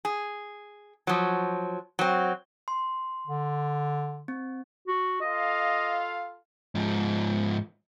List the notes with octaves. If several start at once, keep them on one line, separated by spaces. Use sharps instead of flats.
G#4
F3 F#3
F#3 C4
C6
D3
C4
F#4
F4 A4 D#5 F5
G#2 F3